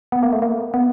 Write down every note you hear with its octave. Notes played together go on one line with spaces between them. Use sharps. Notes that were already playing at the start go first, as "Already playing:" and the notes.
B3
A#3
A3
A#3
B3